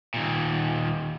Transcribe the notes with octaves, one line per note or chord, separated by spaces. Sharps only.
D#2 A#2